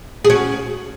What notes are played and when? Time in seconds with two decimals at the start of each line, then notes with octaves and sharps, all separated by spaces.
0.25 G#4
0.30 C#4 F#4